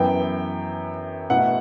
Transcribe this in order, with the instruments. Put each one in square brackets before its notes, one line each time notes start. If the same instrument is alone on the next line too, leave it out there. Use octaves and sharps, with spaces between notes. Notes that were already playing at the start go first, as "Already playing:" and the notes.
Already playing: [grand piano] F#2 E3 B3 G5
B2 A3 E4 F#5